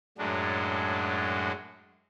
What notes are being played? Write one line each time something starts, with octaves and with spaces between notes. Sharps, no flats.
F#2 A2 F#3 G#3 D4